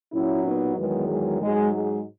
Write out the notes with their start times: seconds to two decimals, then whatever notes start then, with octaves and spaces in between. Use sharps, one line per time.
0.13 A#2 F#3 C#4 E4
0.45 B3 D#4
0.77 E2 D#3 F#3 G#3 B3
1.09 G#3
1.41 G#2 F#3 G#3
1.73 G#3